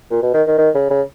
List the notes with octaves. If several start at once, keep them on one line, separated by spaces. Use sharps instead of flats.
A#2
B2
D#3
D#3
D#3
C#3
C#3